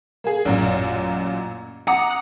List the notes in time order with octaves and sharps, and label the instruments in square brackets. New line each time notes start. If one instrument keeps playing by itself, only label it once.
[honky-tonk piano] A#3 G#4
A1 F#2 A#2
[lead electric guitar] F#5 [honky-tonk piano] A#5 D6 D#6